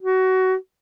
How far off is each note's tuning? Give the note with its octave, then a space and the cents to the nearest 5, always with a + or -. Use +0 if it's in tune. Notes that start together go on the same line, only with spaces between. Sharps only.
F#4 +20